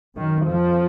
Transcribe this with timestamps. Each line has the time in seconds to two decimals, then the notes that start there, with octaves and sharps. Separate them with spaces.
0.16 F#2 D#3
0.46 F2 F3